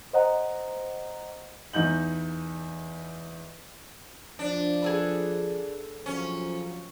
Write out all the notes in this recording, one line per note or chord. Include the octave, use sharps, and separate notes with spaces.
C5 D#5 F#5 A#5
E2 D#4 G6 F#7
F3 D4
G#4 A4 B4
F3 F#3 C#4